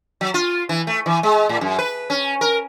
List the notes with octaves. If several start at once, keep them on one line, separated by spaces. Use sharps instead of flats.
F#3
F4
E3
A3
E3
G#3
A2
F#2
B4
C#4
A#4